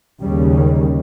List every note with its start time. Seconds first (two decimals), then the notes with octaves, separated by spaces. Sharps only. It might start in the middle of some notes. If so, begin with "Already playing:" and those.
0.21 D#2 C#3 G3
0.53 G3